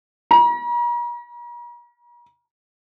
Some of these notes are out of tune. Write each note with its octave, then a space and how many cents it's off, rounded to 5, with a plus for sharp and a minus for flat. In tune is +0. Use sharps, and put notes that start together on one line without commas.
A#5 +45